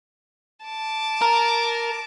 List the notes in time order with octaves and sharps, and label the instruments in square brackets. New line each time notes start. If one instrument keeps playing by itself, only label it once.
[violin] A5 D6
[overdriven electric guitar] A#4